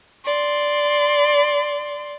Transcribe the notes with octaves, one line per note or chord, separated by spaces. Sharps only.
D5 C6